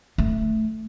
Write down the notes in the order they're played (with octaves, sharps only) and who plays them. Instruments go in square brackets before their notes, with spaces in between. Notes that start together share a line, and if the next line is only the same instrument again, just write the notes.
[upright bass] A3